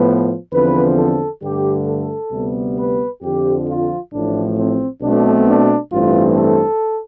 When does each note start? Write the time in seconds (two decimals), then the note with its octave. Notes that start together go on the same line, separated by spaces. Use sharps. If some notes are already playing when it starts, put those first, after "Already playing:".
Already playing: A2 F3 B3 B4
0.53 E2 D3 F3 C4 B4
0.98 A4
1.43 G2 D3 A3 G4
1.88 A4
2.32 D2 C3 G3 B3
2.78 B4
3.23 F2 D3 F3 G4
3.68 F4
4.13 A1 A2 F3 D4
4.58 C4
5.02 B1 B2 A3 C4 D4
5.47 D4
5.93 A1 G2 E3 A3 C4 F4
6.37 A4